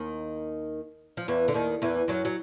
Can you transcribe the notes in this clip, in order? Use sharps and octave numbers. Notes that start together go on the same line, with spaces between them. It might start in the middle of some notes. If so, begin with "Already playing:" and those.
Already playing: D#2 D#3
F3
E2 E3
D3
D#2 D#3
E2 E3
F#2 F#3
F#3